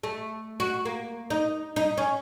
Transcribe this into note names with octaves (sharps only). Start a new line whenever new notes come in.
A3
F#4
A#3
D#4
D#4
C#4